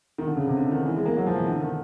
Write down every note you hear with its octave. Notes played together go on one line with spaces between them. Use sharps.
D#3
D3
C#3
C3
D3
D#3
E3
G#3
A#3
F#3
F3
E3
D3
D#3